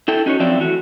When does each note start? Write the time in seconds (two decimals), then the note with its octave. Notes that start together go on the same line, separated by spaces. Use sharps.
0.08 E4 A4 G5
0.26 C#4 D#4 F#4 A4 C5 C#5
0.40 F3 F#3 C4 D5 E5 G5
0.59 E3 A3 F#4